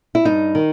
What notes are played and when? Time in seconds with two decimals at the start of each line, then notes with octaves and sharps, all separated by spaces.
0.15 E4
0.25 G2 D#4
0.55 D#3